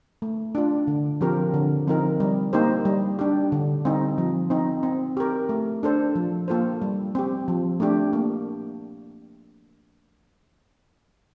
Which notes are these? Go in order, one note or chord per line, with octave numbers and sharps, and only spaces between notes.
A3
D4 F4
D3
F3 C4 G4 A#4
D3
F3 C4 D#4 A#4
G3
A#3 D#4 G4 C5
G3
D4 G4
D3
G3 C4 D#4
F3
C4 D#4
C4
G4 A#4
A3
D4 A4 C5
F3
A#3 F4 A4 C5
G3
C4 G4
F3
A3 D4 G4
A#3